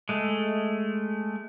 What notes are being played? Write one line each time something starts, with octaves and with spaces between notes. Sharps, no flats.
G#3 A3